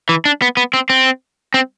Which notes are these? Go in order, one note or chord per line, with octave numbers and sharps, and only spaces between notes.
E3
D4
B3
B3
C4
C4
C4